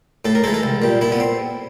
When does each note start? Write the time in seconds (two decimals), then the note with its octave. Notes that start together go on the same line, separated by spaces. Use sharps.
0.25 A2 A4
0.35 A#4
0.44 E3 G#3 A4
0.54 A4
0.63 C2
0.82 A#2 G3
1.01 A#2 E4
1.12 B3
1.20 C4